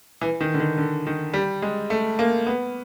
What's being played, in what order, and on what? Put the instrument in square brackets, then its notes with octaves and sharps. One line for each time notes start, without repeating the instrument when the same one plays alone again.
[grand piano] E3
D#3
D3
D#3
D3
D#3
G3
G#3
A3
A#3
B3